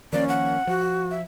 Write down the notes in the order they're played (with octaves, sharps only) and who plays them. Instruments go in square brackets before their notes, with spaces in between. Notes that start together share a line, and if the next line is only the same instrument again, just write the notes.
[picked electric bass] D#3 F3 A#3 [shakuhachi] C#4 [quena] D5
[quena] F#5
[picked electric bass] F3 [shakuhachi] F#4
[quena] E5